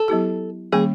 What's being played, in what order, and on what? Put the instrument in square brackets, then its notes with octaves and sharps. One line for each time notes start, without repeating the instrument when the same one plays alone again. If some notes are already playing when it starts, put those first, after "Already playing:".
Already playing: [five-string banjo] A4
[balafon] F#3 B3 E4 G4
[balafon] D#3 G3 A#3 C#4 [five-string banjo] G#4